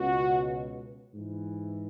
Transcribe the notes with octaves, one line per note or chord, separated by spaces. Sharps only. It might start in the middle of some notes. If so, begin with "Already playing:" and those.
Already playing: C#2 B2 F#4
G#2 E3